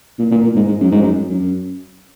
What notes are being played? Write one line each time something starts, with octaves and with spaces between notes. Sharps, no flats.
A#2
A#2
A#2
G#2
G#2
F#2
G#2
F#2
F#2